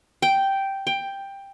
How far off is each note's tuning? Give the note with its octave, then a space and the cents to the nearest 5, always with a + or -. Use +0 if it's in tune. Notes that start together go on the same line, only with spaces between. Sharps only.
G5 -5
G5 +10